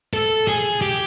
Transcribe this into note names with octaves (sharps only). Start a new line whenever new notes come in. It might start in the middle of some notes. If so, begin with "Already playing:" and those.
A4
G#4
G4